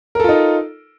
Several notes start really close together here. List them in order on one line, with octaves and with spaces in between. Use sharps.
A#4 A4 F4 D#4